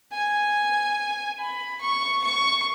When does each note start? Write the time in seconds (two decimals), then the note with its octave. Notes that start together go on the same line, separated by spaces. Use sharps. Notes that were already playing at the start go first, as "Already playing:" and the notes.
0.12 G#5
1.39 B5
1.81 C#6
2.24 C#6